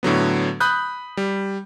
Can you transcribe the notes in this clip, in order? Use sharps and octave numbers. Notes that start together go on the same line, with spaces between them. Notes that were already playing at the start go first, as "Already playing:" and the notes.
A2 D3 F#3 B3
B5 D#6 F#6 G6
G3